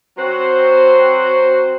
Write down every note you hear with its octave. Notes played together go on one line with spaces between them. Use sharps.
F#3 C4 F#4 C5